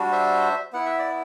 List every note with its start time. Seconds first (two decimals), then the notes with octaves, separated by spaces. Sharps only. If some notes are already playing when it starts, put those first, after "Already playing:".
Already playing: G3 D4 F#4
0.12 C5 E5
0.73 B3 E4 F#5
0.86 E5
0.98 D5